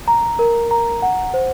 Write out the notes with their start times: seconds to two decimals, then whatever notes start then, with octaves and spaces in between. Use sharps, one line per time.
0.08 A#5
0.39 A#4
0.71 A#5
1.02 F#5
1.34 C5